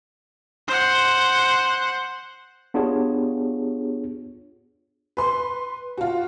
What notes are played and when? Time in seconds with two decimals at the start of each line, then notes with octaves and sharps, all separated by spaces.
0.68 C5 F#5
2.74 B3 D4 F4 G4 G#4 C#5
5.17 B4 C6
5.98 F4 F#4